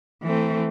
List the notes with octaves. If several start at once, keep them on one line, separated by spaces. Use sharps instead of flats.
E3 A3 C4